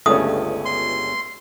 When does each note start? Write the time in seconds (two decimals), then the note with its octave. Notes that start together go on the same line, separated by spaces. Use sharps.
0.06 G1 C#2 G2 A3 C#4 D#6
0.65 C6